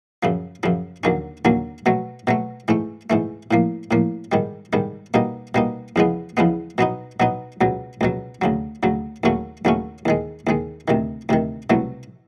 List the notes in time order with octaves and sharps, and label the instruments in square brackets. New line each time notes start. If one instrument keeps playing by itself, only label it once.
[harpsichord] F#2 C#3 F3
F#2 C#3 F3
D#2 D3 F#3 A#3 C#4
D#2 D3 F#3 A#3 C#4
B2 F#3 A3
B2 F#3 A3
G#2 E3 A3
G#2 E3 A3
A2 F3 A#3
A2 F3 A#3
G#2 D#3 G3
G#2 D#3 G3
B2 G3 A#3 D#4
B2 G3 A#3 D#4
E2 C#3 F3 G#3 B3
E2 C#3 F3 G#3 B3
B2 F#3 B3 D#4
B2 F#3 B3 D#4
C#2 B2 F#3
C#2 B2 F#3
D2 C#3 F#3
D2 C#3 F#3
D#2 C#3 F#3 A3 C#4
D#2 C#3 F#3 A3 C#4
D#2 D#3 G#3
D#2 D#3 G#3
D2 C3 D#3
D2 C3 D#3
C2 B2 F#3 A3